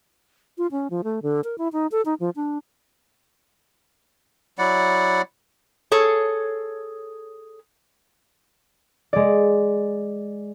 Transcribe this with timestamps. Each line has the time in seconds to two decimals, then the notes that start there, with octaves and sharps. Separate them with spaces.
0.58 F4
0.71 C#4
0.90 F3
1.04 A3
1.23 D3
1.44 A#4
1.58 E4
1.73 D#4
1.92 A4
2.05 D#4
2.20 F3
2.36 D4
4.58 F#3 E4 D5 F#5
5.92 G#4 A4 C#5
9.13 G#3 D5